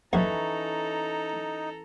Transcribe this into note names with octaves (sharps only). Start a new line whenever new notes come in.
A#1 F#2 E3 C#4 D#4 F#4 A4 A#5